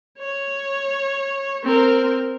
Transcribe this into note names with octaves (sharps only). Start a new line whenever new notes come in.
C#5
C4 A#4